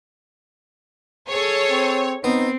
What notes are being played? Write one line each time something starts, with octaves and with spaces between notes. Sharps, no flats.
G#4 A4 C#5
C4
B3 C4 D#4